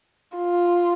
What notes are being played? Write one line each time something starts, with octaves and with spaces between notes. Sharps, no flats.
F4